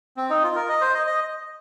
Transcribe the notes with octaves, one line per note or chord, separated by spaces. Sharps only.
C4
D#4
F4
A#4
D#5
C5
D#5
D#5